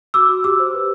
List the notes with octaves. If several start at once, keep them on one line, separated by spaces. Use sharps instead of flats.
F#4 D6 E6
F#4
G4 D6 E6
C5
B4